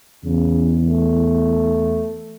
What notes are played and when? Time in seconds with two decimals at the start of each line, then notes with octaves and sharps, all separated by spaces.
0.25 E2 C#3
0.87 A3